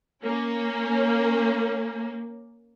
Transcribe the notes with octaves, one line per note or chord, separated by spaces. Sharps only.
A#3 C#4